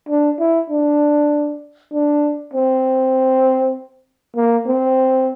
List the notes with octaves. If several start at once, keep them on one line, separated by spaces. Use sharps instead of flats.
D4
E4
D4
D4
C4
A#3
C4